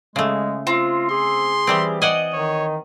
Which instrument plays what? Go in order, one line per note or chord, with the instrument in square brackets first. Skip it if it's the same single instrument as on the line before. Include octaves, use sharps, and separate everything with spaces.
[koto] C#3 A3 [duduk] G#3
[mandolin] C4 [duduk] F4
[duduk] G#4 [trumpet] C6
[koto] E3 G3 C4 [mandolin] G4
[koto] D5 F#5 G#5 [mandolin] D#5
[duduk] D#3 [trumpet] C#5